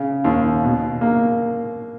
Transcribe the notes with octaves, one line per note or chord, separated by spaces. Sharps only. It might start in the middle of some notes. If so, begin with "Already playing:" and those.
Already playing: C#3
D#2
B2
A#3